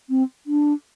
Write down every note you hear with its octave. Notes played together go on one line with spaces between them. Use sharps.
C4
D4